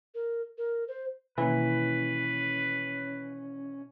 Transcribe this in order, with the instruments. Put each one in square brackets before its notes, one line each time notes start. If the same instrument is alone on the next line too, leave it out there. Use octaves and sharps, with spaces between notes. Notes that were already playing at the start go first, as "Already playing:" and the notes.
[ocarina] A#4
A#4
C5
[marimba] B2 D#3 A#3 [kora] E3 [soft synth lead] C#4 [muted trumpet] B4